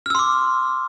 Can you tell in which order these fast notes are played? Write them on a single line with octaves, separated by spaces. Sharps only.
F6 E6 C6 D6